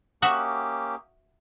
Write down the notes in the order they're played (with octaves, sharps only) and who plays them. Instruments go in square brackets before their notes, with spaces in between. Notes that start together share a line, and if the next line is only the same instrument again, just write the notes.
[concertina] A#3 C#4 G4 [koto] F#4 E5 F#5 [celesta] D#6